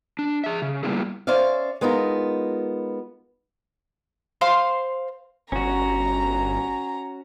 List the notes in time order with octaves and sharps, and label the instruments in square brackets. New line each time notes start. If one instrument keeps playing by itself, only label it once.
[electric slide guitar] D4
G#4 E5
C#3
G3 A#3 B3 E4 F4 G#4
[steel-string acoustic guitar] C#4 C5 D5 E5 F5
G#3 B3 D#4 F4 A#4
[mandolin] C5 F5 C6
[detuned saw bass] G1 [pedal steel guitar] C#4 F#4 [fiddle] A#5